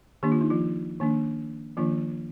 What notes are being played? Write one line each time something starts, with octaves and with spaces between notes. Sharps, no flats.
D#3 A#3 D4 G4
F4
D#4
F3 F4
D#3 A#3 D4
D#3 F3 A#3 D4 F4